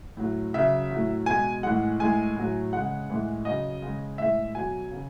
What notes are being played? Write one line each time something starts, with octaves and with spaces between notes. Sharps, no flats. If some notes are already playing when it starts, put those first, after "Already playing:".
A2 F#3
C#3 F#3 E5
A2 F#3
B2 G#3 G#5
A2 E3 G#3 F#5
A2 G#3 G#5
A2 F#3
C#3 G#3 F#5
A2 E3 G#3
C#3 F#3 D#5
C#3 G#3
A2 G#3 E5
B2 F#3 G#5
C#3